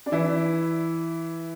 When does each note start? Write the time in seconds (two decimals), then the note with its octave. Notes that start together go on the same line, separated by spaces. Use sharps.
0.06 D4
0.12 E3 E4